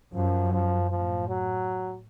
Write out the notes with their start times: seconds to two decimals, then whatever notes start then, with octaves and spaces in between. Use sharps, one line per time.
0.15 F#2 F3
0.53 F3
0.90 A2 F3
1.28 F#3